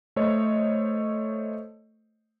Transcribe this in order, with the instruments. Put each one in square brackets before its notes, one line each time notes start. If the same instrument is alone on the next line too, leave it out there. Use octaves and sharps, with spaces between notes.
[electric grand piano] A3 A4 C5 C#5 D#5